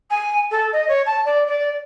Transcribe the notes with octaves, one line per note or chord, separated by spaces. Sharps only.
G#5
A4
D#5
C#5
A5
D5
D5